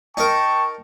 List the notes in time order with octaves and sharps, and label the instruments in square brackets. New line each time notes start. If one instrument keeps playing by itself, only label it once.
[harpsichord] D#4 A#4 [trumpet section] G5 A5 C#6